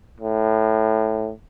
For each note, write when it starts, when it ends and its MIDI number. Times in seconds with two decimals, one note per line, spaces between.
0.20 1.31 45